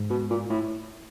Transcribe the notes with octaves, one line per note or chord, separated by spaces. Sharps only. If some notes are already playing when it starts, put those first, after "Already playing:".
Already playing: G#2
B2
A#2
A2